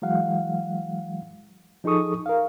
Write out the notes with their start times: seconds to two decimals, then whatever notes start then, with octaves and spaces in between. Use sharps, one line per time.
0.02 E3 F#3 G#3 F5 F#5
1.84 F3 D#4 G#4 A4 C#6 D#6
2.26 A#4 F5